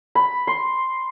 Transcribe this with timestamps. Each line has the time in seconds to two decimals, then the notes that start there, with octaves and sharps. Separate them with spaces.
0.15 B5
0.47 C6